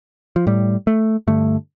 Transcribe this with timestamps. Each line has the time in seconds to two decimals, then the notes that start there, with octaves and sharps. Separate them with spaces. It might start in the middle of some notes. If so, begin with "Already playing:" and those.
0.36 F3
0.47 A2 G3
0.87 A3
1.27 G2 D3 A3